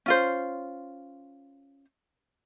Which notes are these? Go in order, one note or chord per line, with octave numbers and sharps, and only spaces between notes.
C#4 F4 C5